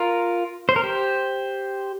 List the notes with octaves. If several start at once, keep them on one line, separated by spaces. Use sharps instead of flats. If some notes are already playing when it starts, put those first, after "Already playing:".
Already playing: F4 A#4
C5
A#4
G4 C5